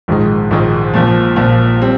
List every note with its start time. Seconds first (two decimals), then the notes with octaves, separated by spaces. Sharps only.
0.08 A#1 G#2 D#3 G#3 D#4
0.51 A#1 G#2 D#3 G#3 D#4
0.94 A#1 A#2 F3
1.36 A#1 A#2 F3
1.81 G3 C4